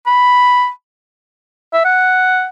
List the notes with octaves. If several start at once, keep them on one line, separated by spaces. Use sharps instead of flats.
B5
E5
F#5